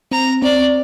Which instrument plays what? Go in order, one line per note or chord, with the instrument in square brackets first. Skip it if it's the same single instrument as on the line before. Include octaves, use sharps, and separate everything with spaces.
[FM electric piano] C4 [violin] A#5
[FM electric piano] C4 [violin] D5